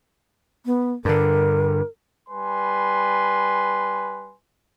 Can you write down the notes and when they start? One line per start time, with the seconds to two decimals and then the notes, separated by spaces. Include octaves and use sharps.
0.66 B3
1.05 G2 D3 A#4
2.28 G3 B4 G#5 C6